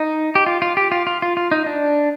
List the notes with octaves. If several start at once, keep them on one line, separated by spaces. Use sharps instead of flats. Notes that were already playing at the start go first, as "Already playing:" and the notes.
Already playing: D#4
G4
F4
F4
G4
F4
F4
F4
F4
D#4
D4